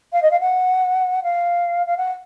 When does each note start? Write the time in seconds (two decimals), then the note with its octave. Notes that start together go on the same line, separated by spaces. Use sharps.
0.12 F5
0.22 D#5
0.31 F5
0.40 F#5
1.23 F5
1.86 F5
1.97 F#5